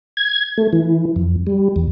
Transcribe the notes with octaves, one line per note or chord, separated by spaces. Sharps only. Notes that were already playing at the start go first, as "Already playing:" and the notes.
G#6
A3
E3
F2
G3
E2